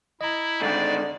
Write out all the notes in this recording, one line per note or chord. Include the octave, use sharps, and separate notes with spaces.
E4 D#5 A#5
G#2 D3 D#3 D5